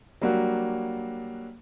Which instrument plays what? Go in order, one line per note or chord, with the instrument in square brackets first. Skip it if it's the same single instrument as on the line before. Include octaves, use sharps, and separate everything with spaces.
[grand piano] F#3 G3 A#3 D4 F#4